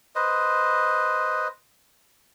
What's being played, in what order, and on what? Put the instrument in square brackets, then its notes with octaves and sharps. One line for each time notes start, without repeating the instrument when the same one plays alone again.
[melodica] B4 C5 D#5